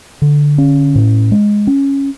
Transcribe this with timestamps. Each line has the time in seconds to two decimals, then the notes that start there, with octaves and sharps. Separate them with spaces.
0.22 D3
0.58 C#4
0.95 A2
1.31 G#3
1.67 C#4